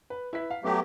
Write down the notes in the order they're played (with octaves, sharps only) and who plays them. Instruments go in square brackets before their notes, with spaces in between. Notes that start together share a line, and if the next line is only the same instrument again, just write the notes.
[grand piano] B4
E4 B4 B6
F5
[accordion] F#3 A3 G4 [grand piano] B3